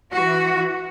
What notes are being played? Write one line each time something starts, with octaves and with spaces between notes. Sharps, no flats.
E3 F#4